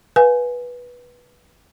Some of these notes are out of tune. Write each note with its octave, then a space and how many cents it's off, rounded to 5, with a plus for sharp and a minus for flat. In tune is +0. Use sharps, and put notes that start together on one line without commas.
B4 -15 F5 +35 G#5 +0